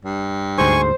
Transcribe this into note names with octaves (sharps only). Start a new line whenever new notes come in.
G2
D2 G#2 C5 G#5 C#6